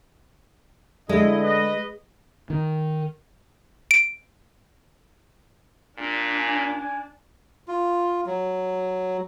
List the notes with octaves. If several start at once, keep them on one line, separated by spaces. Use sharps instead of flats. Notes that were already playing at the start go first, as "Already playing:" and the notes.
D3 G#3 E4 D#5
B4 D#5
D#3
D7
A#2 D4
G#5
G#5
F4
F#3